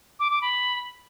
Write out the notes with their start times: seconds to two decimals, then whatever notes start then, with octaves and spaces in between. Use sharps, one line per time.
0.20 D6
0.31 D6
0.42 B5